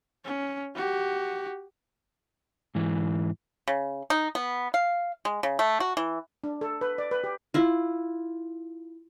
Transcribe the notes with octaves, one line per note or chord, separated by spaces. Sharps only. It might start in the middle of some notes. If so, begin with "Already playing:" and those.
C#4
F#4 G4
G#2 E3
C#3
D#4
B3
F5
G#3
C#3
A3
F#4
E3
D4
A4
B4
D5
B4
G4
E4 F4